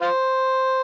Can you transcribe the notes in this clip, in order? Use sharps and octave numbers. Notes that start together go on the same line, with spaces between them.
F4 C5